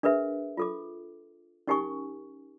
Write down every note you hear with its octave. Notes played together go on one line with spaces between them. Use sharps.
D4 G#4 A#4 B4 E5
F4 A4 D6
C#4 D#4 G4 A#4 G#5 C#6